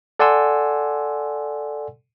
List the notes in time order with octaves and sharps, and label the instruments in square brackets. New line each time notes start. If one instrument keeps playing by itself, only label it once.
[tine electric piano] A4 D5 F#5 G#5 C6 E6